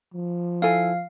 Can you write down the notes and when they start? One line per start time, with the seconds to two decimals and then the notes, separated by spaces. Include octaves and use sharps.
0.14 F3
0.62 E4 A4 F5 G#5